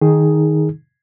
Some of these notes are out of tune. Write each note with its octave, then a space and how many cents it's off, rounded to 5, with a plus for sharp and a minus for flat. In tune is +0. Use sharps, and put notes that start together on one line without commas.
D#3 +0 D#4 +5 G#4 +0